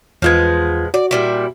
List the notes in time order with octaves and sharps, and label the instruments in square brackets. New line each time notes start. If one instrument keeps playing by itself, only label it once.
[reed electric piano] E2 F4 G#6 [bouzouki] F3 G#3 B3
[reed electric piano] F#4 [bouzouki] D5
[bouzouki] A#2 G3 E4